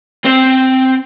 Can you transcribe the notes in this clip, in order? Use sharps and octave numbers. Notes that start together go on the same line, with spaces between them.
C4 C5